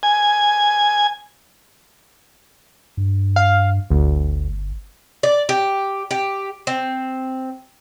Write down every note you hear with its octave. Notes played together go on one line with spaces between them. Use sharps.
G#5
G2
F5
G1 D2
D5
G4
G4
C4